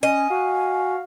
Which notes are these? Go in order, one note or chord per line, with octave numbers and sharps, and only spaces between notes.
C#4 D#5 G#5
F#4 F5